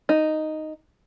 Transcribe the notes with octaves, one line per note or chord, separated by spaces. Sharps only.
D#4